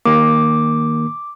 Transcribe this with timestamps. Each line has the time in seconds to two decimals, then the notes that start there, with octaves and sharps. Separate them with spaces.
0.05 D#3 A#3 D6